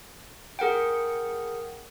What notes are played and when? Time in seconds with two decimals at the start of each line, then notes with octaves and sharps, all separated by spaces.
0.59 G#4 A#4 F#5 G5